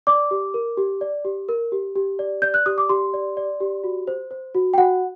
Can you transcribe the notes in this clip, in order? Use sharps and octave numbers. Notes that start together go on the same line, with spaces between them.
D5 D6
G4
A#4
G4
D5
G4
A#4
G4
G4
D5
D5 G6
F#6
G4 D#6
D6
G4 C6
D5
D5
G4
F#4
C5
C5
F#4
G5
F#4 F#5